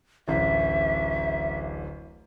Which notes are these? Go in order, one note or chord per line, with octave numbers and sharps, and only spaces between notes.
D1 A1 E5